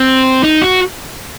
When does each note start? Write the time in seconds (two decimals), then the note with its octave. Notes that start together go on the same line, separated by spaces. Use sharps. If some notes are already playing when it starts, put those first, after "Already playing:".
Already playing: C4
0.44 D#4
0.62 F#4